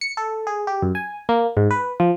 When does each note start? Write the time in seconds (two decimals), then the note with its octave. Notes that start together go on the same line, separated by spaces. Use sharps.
0.01 C#7
0.17 A4
0.47 G#4
0.67 G4
0.82 F#2
0.95 G#5
1.29 A#3
1.57 G#2
1.71 B4
2.00 F3